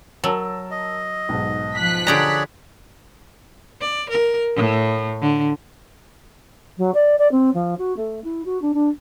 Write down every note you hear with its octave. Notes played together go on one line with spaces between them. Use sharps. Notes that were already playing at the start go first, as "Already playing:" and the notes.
F#3 A#4 A5 E6
D#5
B1 G#2
F3 F#6 B6
D3 G4 G#4 C#5 D5 A#5
D5
A#4
A2
D3
F#3
D5
D5
C4
F3
F#4
A3
E4
F#4
D4
D4